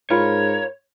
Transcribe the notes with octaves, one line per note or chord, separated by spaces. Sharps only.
G#2 F4 A#4 C#5 B5